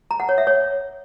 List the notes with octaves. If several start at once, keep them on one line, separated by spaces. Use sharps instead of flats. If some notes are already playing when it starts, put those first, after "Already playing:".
A#5
F#5
C#5
E5
C#5